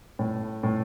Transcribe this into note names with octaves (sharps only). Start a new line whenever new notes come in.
A2
A2